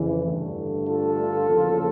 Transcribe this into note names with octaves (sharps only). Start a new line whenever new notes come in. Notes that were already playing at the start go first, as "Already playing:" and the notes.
Already playing: F2 C#3 E3
G2 D3 A3
F4 A4
E2 C#3 F3 A#3